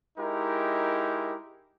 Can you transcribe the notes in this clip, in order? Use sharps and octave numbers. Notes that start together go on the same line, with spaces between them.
G#3 D#4 E4 G4 A#4